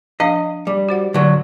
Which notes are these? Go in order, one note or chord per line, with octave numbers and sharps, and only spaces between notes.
F3 D4 D#5 F5
G3
F#4 C5 F#5
D3 F#3